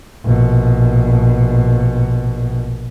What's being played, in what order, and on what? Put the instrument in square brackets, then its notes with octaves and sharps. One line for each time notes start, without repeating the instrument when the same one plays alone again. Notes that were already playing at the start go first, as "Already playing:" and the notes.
[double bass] A#1 B2